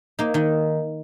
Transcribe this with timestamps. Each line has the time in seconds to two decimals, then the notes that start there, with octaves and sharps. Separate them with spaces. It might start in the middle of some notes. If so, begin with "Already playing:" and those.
0.19 A#3 D#4
0.34 D#3 D#4